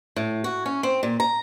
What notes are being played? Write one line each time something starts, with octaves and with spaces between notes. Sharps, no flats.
A2
F#4
C#4
C4
A#2
A#5